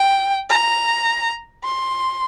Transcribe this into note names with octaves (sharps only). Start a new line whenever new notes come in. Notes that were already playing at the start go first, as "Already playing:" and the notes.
Already playing: G5
A#5
C6